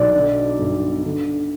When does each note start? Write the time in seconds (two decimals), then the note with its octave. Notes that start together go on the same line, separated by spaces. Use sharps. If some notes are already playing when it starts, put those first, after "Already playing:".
Already playing: B1 D5
0.14 D3
0.59 G1
1.05 D3